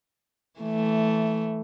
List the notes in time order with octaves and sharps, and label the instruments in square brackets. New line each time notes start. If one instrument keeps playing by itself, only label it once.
[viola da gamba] E3 A3